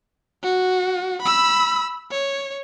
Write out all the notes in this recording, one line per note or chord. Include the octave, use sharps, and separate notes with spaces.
F#4
B5 E6
C#5